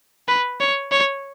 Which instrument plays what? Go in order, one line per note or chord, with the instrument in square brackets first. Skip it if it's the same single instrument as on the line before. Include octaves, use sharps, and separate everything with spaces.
[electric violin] B4
C#5
C#5